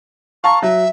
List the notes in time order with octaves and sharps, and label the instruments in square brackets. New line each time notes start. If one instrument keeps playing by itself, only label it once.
[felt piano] F5 A5 A#5 [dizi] C#6
[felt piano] F#3 [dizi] E5